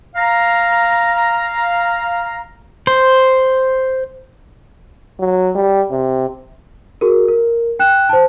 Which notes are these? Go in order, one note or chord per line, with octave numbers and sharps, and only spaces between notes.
F5 A#5
C5
F#3
G3
C3
F#4 G#4 A#4
A#4
G5 F#6 E7
C5 A5